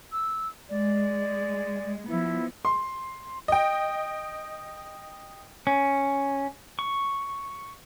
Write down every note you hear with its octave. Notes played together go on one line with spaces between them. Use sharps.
E6
G#3 D5
F3 B3 E4
C6
D#5 G5
C#4
C#6